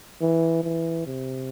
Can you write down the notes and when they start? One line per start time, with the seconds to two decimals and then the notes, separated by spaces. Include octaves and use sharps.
0.21 E3
0.63 E3
1.06 C3